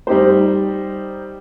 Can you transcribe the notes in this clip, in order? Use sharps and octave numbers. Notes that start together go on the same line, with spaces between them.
G3 D#4 G4 C5